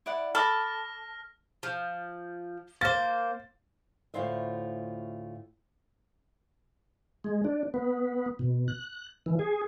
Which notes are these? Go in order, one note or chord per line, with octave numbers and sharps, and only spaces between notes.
E4 D5 F#5
A4 B5 D6 F6 A#6
F3
A#3 C5 A6
D2 A2 E4 F4 C5 E5
G#3
D4
B3
B2
F#6
E3
G#4